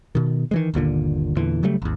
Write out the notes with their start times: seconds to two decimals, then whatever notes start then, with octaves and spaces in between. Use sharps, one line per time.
0.15 B2 D#3
0.51 D#3 E3 G#3
0.74 G1 D#2 A#2 D3
1.36 E2 A#2 D3 E3
1.63 C#3 F#3 G3 A3
1.82 G#1 D#2